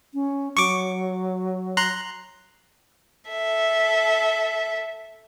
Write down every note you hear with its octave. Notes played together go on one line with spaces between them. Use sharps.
C#4
F#3 C#6 D6
A#5 C6 F#6
A4 E5